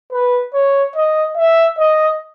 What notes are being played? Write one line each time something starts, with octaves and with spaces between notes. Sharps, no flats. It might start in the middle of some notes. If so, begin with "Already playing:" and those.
B4
C#5
D#5
E5
D#5